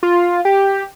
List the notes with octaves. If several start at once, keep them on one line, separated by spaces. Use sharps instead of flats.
F4
G4